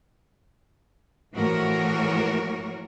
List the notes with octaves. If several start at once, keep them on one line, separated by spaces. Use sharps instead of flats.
A2 E3 F3 F#4 A#4 C#5